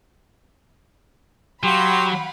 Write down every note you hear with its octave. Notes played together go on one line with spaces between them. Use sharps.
F#3 G4 F5 F#5 B5 C6